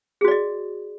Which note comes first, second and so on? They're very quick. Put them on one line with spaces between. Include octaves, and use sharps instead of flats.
G#4 F#4 D5 D#5